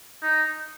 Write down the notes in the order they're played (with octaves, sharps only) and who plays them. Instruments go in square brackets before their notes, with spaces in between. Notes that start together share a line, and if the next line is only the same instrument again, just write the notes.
[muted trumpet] D#4